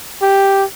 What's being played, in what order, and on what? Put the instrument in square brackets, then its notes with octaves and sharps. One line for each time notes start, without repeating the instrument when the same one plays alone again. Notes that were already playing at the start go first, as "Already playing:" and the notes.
[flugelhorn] G4